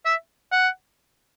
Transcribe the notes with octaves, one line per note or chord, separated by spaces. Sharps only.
E5
F#5